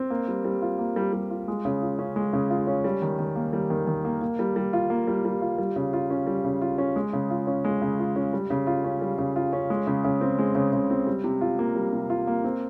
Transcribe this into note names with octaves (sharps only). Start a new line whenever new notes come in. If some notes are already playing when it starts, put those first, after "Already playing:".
Already playing: C4
A#3
G3
G3
F4
A#3
G3
G3
F4
G#3
C#3
F4
C#4
G#3
C#3
F4
C#4
G3
D#3
D#3
A#3
G3
D#3
D#3
A#3
A#3
G3
G3
F4
A#3
G3
G3
F4
G3
C#3
F4
C#4
G3
C#3
F4
C#4
G#3
C#3
F4
C#4
G#3
C#3
F4
C#4
G3
C#3
F4
C#4
G3
C#3
F4
C#4
G#3
C#3
C#3
C4
G#3
C#3
C#3
C4
G3
C3
F4
A#3
G3
C3
F4
A#3
C4